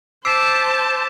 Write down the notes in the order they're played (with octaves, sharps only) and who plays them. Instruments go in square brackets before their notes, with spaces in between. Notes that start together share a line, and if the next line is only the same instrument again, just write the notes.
[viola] C5 A5 [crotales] D6 B6 E7 [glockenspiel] E6 C7 D7